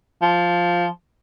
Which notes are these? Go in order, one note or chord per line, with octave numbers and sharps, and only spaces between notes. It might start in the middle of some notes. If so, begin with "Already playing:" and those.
F3